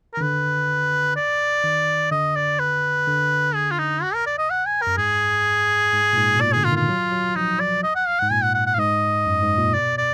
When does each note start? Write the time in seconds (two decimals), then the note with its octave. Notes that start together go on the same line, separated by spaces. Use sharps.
0.14 A#4
0.17 D#3
0.21 D3 B4
1.17 D5
1.64 D#3
2.12 D3 D#5
2.36 D5
2.59 B4
3.07 D3
3.55 G#4
3.71 F4
3.79 D#4
4.03 F#4
4.14 A#4
4.26 D5
4.38 D#5
4.50 F#5
4.66 G#5
4.82 A#4
4.87 F#2
4.98 G#2 G#4
5.93 G#2
6.13 A#2
6.17 G#2
6.35 B2
6.41 A#2 D5
6.53 D3 G#4
6.64 F4
6.72 D#3
6.76 F4
6.89 F#3
7.12 F#3
7.35 F3 D#4
7.60 D5
7.83 D#5
7.95 F#5
8.08 F5
8.20 G#2 F#5
8.31 A#2 G#5
8.43 F#5
8.55 F#5
8.67 F#5
8.74 F5
8.78 G#2 D#5
9.26 F#2
9.43 G#2
9.58 A#2
9.74 B2 D5
9.98 D5